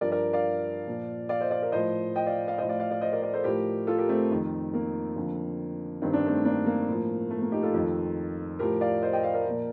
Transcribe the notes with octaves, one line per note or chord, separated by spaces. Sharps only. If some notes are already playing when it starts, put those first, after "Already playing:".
G2 F3 A#4 D5
A#4 D5
D5 F5
A#2 F3
D5 F5
C5 D#5
D5 F5
A#4 D5
A2 F3 C5 D#5
D#5 G5
D5 F5
D5 F5
A2 F3 C5 D#5
D5 F5
D5 F5
D5 F5
C5 D#5
A#4 D5
A#4 D5
A4 C5
A2 F3 G4 A#4
F4 A4
G4 A#4
A3 C4
F2 D#3
A#3
F2 D3 F3
G2 D#3 C4
D4
A3 C4
A#3 D4
A#3
A2 F3
A3
A#3
D#4 G4
F4 A4
F2 D#3
A2 F3 G4 A#4
D5 F5
C5 D#5
D#5 G5
D5 F5
A#4 D5
A#2 F3